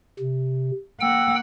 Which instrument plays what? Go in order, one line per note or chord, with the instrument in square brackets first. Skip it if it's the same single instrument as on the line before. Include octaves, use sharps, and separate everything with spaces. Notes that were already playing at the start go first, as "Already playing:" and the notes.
[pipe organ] C3
[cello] A#3 F#5 [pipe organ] G5 E6